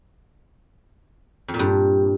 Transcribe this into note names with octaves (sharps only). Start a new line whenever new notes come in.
F2
A#2
G2